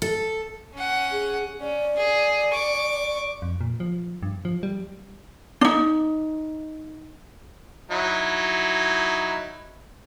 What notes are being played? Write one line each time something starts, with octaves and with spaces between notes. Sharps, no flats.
A4
C#4 F#5
G#4
C#4 D5
G#4
C#6 D6
F2
A#2
F3
G2
F3
G3
D4 D#4
F#3 D#4 E4